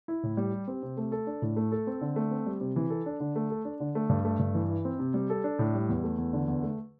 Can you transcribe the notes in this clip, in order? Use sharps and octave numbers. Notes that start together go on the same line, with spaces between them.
E4
A2
G3
G4
C4
C3
A3
A4
D4
A2
A3
A4
C4
D3
A3
C4
G3
C3
E3
A4
D4
D3
A3
A4
D4
D3
A3
G2
A3
G2
E3
E4
C4
C3
G3
A4
D4
A2
G3
E2
A3
E2
D3
E2
A3